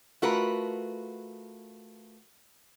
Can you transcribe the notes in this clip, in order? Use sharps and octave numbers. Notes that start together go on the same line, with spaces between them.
A3 F4 F#4 A#4 B4